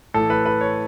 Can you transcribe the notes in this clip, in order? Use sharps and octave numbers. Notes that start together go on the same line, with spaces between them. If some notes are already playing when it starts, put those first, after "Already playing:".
A2 E3 A4
B4
B4
C#5